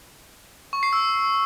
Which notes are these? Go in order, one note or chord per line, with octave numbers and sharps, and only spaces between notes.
C#6
C7
E6